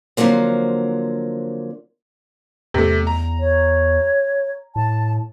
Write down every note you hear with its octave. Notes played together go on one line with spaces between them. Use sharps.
D3 F3 F#3 A#3 C4
E2 C3 A3
A#5
C#5
A2 A5